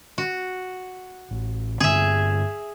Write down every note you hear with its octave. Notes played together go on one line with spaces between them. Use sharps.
F#4
A1
G2 D3 C4 G#4 E5